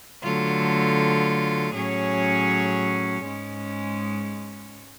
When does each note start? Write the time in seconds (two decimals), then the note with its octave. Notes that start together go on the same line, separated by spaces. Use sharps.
0.23 D3 F#3 A3 F4
1.74 A2 F#3 C#4 G#4 C#5
3.24 G#2 G#3 C#4